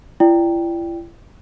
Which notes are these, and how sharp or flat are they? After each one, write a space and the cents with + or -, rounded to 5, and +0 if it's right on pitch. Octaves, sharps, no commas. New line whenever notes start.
E4 +40 D5 +0 G5 +0